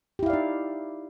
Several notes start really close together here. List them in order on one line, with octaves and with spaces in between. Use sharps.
G4 E4 F5 D5 D#4